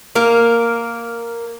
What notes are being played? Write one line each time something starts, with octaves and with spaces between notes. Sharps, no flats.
A#3 A#4